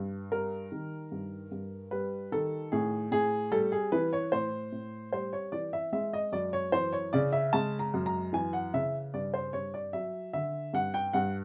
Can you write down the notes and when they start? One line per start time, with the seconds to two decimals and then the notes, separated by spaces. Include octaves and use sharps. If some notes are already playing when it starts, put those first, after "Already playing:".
Already playing: G2
0.32 G3 A#4
0.72 D#3
1.12 G2
1.51 G2
1.91 G3 B4
2.32 D#3 A4
2.72 A2 G#4
3.11 A2 G#4
3.52 G3 A4
3.72 G#4
3.92 E3 B4
4.13 C#5
4.32 A2 C5
4.72 A2
5.13 G3 C5
5.33 C#5
5.52 E3 D5
5.73 E5
5.93 G#3 E5
6.13 D#5
6.32 F#2 D5
6.53 C#5
6.72 E3 C5
6.93 C#5
7.13 C#3 D5
7.33 E5
7.53 G#3 A5
7.79 A#5
7.94 F#2
8.06 A#5
8.33 E3 G#5
8.53 F#5
8.74 C#3 E5
9.14 G2 D5
9.34 C5
9.53 G2 C#5
9.74 D5
9.93 F#3 E5
10.33 D3 E5
10.73 G2 F#5
10.94 G5
11.13 G2 F#5